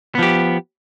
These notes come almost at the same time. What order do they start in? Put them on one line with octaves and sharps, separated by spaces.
B3 F3 G4